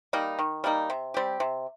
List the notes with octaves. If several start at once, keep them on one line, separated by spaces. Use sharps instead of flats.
G3 A#3 D#4
D#3
G3 A#3 D#4
C3
G3 C4 G4
C3